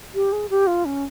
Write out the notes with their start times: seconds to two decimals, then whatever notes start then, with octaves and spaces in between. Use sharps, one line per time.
0.15 G4
0.32 G#4
0.50 G4
0.67 F4
0.85 C#4